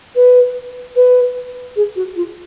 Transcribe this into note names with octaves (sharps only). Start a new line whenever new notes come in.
B4
B4
G#4
F#4
F4